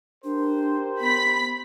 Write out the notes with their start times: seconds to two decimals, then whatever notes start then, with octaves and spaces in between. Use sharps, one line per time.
0.24 D4 G4 A#4 C5
1.00 B3 B5 B6